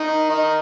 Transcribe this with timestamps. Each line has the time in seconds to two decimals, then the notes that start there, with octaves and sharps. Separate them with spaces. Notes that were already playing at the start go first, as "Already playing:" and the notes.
Already playing: D#3 D#4
0.30 D#3 D#4